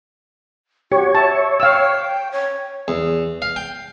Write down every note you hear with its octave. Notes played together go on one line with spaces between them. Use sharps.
F#4 G4 C#5
E5 A5
F5 G5 E6
C#5
E2
F5
G5